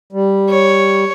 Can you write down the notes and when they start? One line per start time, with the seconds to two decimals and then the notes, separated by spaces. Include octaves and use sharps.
0.13 G3
0.49 C#5